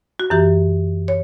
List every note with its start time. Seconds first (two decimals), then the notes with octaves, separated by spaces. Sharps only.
0.20 F#4
0.30 F#2 E3 G4
1.08 C#5